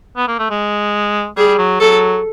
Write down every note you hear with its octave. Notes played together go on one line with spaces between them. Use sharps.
B3
A#3
A3
G#3
G3 G#4
F#3
F#3 A4